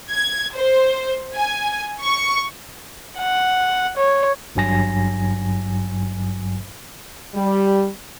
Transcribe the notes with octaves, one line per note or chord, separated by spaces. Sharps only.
G#6
C5
G#5
C#6
F#5
C#5
G#1 G2 F#3 G#5 A#6
G3